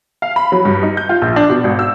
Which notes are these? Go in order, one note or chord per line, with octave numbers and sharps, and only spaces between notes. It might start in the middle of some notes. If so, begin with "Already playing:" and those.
F5
B5
F#3
G2
D#4
G6
F4
A#1
D4
B2
G#1
E6